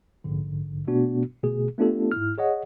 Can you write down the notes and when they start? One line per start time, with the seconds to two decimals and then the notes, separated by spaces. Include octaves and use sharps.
0.24 A#1 G#2 D3
0.87 B2 A3 B3 D4 F#4
1.43 G1 B2 A3 G#4
1.78 A3 B3 D4 F4 G4 A4
2.12 G#2 E4 F6
2.38 G#4 C#5 D#5 F#5